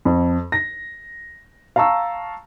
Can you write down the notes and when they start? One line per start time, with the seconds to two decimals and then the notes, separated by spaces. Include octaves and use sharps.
0.05 F2
0.52 A#6
1.76 F5 A5 A#5 C#6 E6